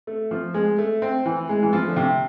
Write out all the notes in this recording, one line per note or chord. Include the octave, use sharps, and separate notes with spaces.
A3
F3
G#3
A3
C4
E3
G#3
E3
F3
D3
C3